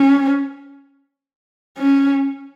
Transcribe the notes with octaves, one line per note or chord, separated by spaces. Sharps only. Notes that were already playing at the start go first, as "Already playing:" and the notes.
Already playing: C#4
C#4